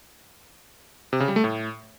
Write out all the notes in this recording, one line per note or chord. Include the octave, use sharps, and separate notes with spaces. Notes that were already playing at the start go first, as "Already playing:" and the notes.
C3
C#3
G3
A3
A2